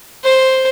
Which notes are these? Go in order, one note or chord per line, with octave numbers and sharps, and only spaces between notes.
C5